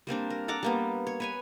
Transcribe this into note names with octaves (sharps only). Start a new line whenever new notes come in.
G3 A#3 C4 D4
A#4
A4 F#5 A#5 D6
G3 A#3 B3
C#5
B4 C#5 G#5